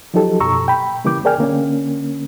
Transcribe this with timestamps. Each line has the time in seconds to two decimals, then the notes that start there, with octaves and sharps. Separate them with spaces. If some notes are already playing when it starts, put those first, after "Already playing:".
0.14 F3 F#3 D#4 G4 A4
0.40 F#2 B2 A#5 C#6 E6
0.67 A#2 G5 B5
1.05 C#3 E3 G3 A#3 D6 G6
1.25 G#4 A#4 D5 G5 G#5 F6
1.38 D3 A#3 C#4